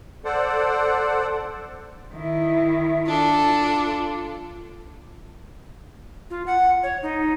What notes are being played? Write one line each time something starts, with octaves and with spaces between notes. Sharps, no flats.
A4 C5 D5 F#5
D#3 E4
D4 F4 A4
F4
F#5
C#5
D#4